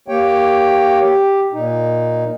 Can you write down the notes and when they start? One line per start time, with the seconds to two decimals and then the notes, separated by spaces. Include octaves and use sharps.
0.08 A#3 G4 C#5 G5
1.00 G4
1.53 A#2 D#4